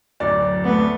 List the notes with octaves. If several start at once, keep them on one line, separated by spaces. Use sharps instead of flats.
D1 F#2 D5
A3 B3